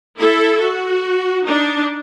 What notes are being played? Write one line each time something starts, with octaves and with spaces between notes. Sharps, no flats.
E4 A4 E5
F#4
D4 D#4